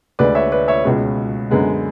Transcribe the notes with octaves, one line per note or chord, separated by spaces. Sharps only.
D2 D3 G#3 B4 D5
C#5 E5
B4 D5
C#5 E5
C#2 B2 G#3 C#4
F#2 D3 G#3 B3